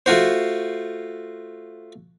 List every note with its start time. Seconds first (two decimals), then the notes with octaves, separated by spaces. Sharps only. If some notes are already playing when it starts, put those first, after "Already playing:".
0.06 A3 F4 F#4 C5